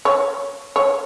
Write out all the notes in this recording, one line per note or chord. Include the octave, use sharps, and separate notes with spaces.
C#5
C#5